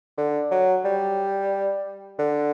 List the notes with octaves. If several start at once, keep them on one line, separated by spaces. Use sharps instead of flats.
D3
F#3
G3
D3